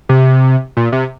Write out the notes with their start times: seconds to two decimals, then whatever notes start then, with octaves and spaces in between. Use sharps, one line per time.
0.09 C3
0.77 A#2
0.92 C3